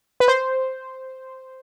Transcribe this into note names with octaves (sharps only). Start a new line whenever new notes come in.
B4
C5